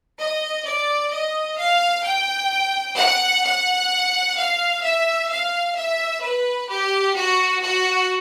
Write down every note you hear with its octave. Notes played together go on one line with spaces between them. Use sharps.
D#5
D5
D#5
F5
G5
F#5
F#5
F5
E5
F5
E5
B4
G4
F#4
F#4